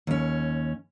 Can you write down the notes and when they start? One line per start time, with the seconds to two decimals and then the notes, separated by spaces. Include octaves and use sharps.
0.07 D#2 C#4